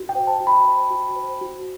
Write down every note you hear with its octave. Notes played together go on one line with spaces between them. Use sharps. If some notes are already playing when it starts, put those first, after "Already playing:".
Already playing: F#4
G5
C5
A5
F#4
B5
C5
F#4
C5
F#4